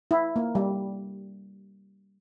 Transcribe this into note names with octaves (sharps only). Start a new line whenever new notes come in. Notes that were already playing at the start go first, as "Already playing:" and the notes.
E4
A#3
G3